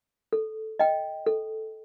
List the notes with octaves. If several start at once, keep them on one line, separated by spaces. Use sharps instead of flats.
A4
D#5 G5
A4